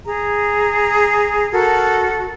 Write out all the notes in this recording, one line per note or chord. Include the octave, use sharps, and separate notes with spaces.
G#4 A#5
F#4 A4 A#4